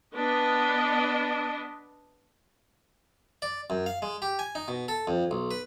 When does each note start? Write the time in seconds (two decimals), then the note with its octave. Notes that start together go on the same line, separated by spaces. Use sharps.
0.14 B3 D4 D#5
3.42 D5
3.70 F#2
3.86 F5
4.02 G#3
4.22 G4
4.39 G#5
4.55 D#4
4.68 B2
4.88 A4
5.07 F2
5.31 B1
5.51 B4